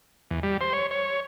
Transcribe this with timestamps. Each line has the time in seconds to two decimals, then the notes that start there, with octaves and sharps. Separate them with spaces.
0.31 E2
0.43 G3
0.61 C5
0.73 C#5
0.91 C#5